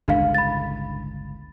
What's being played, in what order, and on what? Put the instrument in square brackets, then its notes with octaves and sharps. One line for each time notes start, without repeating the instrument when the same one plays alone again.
[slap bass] G1 C#2 A2 [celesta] D4 F5
[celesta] B5 A6